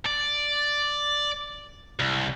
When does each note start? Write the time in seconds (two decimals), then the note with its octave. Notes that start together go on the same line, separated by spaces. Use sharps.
0.06 D5
1.99 C2